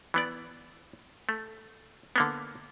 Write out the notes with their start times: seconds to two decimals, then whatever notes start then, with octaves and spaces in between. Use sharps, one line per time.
0.14 E3 B3 D5
1.29 A3
2.16 D3 A#3 B3